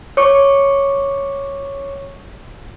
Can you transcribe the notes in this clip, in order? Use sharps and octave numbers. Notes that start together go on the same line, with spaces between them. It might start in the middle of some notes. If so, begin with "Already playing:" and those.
C#5 C#6 D6 C#7